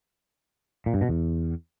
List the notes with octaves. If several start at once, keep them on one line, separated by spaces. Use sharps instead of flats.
A#2
G2
B2
E2